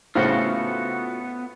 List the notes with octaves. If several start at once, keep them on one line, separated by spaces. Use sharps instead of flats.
A2 C#3 B3 F4 F#4 A4 C5